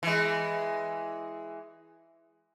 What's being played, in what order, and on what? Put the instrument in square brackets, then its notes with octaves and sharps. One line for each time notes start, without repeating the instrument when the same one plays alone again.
[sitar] E3 G#3